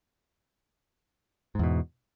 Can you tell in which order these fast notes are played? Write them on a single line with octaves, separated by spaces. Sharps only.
G#2 E2 B2